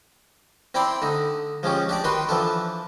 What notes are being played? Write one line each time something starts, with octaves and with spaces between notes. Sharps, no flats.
C4 E4 D5 G5 C6
D3 D#4
F3 G#3 C#4 G4
D4 G4 D5
D#3 F#4 B4 G5 C6
E3 F3 D4 A4